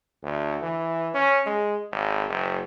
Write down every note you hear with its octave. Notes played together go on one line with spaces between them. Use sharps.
D2
E3
C#4
G#3
G#1
F#1